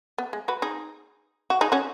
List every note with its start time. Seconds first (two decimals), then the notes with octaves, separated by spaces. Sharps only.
0.18 B3
0.33 G#3
0.48 F#4 B4
0.62 D#4 G#4
1.50 F#4
1.61 D#4 G#4
1.72 C#4 F#4